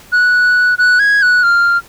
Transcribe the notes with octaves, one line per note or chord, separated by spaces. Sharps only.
F#6
F#6
G#6
F#6
F6